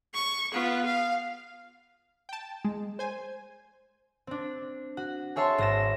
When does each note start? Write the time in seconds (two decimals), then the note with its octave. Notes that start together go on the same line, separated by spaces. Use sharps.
0.14 C#6
0.52 B3 F4
0.86 F5
2.29 G5 A5
2.65 G#3
2.99 C5 G#5
4.27 C4 D4
4.97 F#4
5.36 G#4 C#5 E5 A5 C6
5.58 G#1 A#6 E7